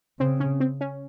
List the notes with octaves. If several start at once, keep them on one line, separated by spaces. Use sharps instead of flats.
C#3 C4
C#4
C4
C#4